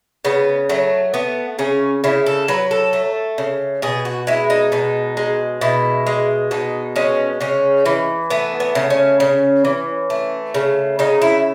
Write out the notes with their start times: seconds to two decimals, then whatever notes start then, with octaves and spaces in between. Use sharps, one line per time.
0.25 C#3 B3
0.69 F#3 A3
1.14 A3 B3
1.59 C#3 C#4
2.04 C#3 E4
2.26 A4
2.48 F#3 B4
2.71 A4
2.93 A3
3.38 C#3
3.82 B2 G#4
4.05 F#4
4.27 G#3 E4
4.50 D#4
4.72 B2 D#4
5.17 G#3
5.61 B2 E4
6.07 G#3
6.51 B2 D#4
6.96 G#3 C#4
7.41 C#3 C#4
7.86 E3
8.30 A3 B3
8.60 B3
8.75 C#3
8.90 C#4
9.20 C#3
9.65 E3
10.10 A3
10.54 C#3
10.99 C#3 D#4
11.22 E4